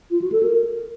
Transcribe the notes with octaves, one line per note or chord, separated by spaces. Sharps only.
F4
F#4
A4
A#4